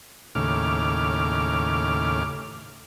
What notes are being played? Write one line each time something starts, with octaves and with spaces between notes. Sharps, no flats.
D#2 A2 C#3 D6 F6